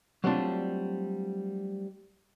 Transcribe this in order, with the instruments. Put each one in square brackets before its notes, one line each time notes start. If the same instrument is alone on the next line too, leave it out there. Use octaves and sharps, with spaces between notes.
[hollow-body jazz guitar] F#3 G3 A3 C4 D4 F4